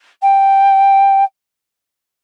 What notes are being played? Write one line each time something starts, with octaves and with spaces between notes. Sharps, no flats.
G5